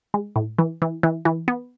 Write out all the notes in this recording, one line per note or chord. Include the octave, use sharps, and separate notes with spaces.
G#3
A2
E3
E3
E3
E3
B3